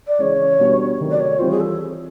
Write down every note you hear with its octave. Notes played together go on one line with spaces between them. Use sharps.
D5
C#3 E3 G#3 C#5
B2 G3 B3 D4
C3 D#3 F#3 A3
D5
C#5
E3 G3 C4 F4 C5
G#4
A4